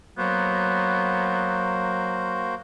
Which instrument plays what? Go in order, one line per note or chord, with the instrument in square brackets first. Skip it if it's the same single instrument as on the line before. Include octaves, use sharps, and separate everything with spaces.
[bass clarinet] F#3 [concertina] A#3 F#4 C5 [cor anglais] B3